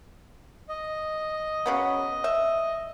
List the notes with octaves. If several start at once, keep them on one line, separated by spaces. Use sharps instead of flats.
D#5
C#3 F#3 B3
E5